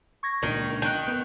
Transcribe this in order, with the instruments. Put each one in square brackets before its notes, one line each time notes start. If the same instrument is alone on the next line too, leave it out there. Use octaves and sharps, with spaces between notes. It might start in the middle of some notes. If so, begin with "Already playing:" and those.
[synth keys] C#6 G#6 A#6
[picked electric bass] C#2 A#2 D4 [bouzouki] D#3
[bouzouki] D#3 [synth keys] F#6 G6
[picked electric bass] B3